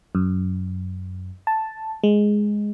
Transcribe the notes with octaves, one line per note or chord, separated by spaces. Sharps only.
F#2
A5
G#3